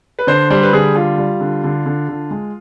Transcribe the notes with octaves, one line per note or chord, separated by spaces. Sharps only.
B4
D3 C5
G3 C5
B4
D3 G#4
G3 F4
G3
D3
D3
D3
D3
G#3